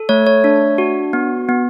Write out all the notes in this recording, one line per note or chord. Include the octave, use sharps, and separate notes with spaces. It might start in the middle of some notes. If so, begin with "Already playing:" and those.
Already playing: A4
A3 C#5
C#5
D4
F#4
B3
B3